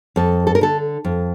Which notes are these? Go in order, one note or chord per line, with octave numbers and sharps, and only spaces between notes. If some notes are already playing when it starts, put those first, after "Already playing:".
F2 A4
A4
A#4
D3 A4
F2